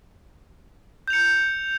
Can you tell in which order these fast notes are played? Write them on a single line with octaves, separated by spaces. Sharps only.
G6 F7 C#7